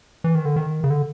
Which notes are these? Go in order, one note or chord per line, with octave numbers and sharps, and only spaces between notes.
E3
D#3
D3
D#3
C#3
D3